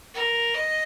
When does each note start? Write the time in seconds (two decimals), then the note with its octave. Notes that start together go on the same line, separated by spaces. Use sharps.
0.14 A#4
0.55 D#5